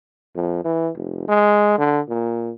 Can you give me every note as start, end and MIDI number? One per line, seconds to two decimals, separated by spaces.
0.36 0.60 41
0.64 0.90 52
0.96 1.28 29
1.28 1.75 56
1.78 2.01 50
2.09 2.52 46